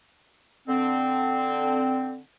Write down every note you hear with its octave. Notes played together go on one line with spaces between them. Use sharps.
D3 C4